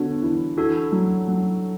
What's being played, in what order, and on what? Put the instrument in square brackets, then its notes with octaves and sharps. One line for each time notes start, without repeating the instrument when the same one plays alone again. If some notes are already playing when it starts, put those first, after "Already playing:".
Already playing: [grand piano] D3 [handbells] B3 D4 F#4 C#5
[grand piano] E3
[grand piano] E3 [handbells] D4 F#4 A4
[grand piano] F#3
F#3